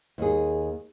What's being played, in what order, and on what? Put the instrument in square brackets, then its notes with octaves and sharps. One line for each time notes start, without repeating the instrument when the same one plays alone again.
[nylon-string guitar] D#2 G#4